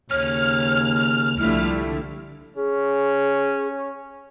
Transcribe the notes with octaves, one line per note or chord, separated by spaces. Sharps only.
D#2 C#3 C#5 F6
C2 D3 F3 G3 A3 E4
C#4 G#4